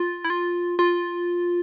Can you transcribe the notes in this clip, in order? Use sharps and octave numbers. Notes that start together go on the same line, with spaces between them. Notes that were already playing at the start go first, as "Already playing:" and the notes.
Already playing: F4
E4
F4
F4